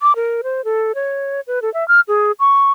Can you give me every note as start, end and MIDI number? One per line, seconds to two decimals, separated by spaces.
0.02 0.15 86
0.16 0.41 70
0.44 0.64 72
0.65 0.92 69
0.95 1.41 73
1.47 1.62 71
1.62 1.72 69
1.74 1.87 76
1.88 2.00 89
2.08 2.32 68
2.40 2.72 85